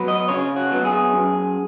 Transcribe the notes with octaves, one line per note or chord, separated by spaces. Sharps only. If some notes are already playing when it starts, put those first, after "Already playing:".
Already playing: F#3 B3
D#5
C#3 C#5
F#4
F#3 B3
G#4
F#2